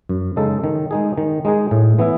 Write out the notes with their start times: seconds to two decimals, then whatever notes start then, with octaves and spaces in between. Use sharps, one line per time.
0.09 F#2
0.36 C#3 G#3 D#4 A4
0.64 D#3
0.91 G#3 D#4 G#4
1.18 D#3
1.45 G#3 D#4 G#4
1.71 A2
1.99 E3 B3 E4